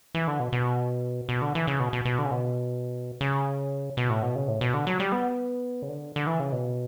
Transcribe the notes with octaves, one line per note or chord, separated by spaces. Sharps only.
E3
D3
B2
B2
B2
D3
E3
C#3
B2
B2
B2
D3
C#3
B2
C#3
B2
A2
B2
C#3
A2
B2
D3
F#3
G3
B3
C#3
D3
D3
E3
C#3
B2